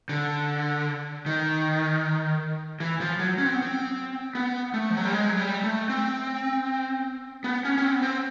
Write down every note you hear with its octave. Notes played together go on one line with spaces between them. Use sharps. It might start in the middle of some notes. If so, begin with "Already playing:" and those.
D3
D#3
E3
F3
F#3
C#4
C4
B3
C4
B3
A3
F3
F#3
G3
G#3
F#3
G3
A3
C4
B3
C#4
C#4
C4
B3
C4